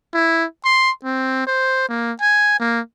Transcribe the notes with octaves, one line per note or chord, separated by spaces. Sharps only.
E4
C6
C4
C5
A#3
G#5
A#3